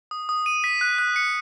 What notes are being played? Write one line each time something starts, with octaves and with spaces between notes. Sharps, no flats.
D#6
D#6
D#7
B6
F#6
F#6
C#7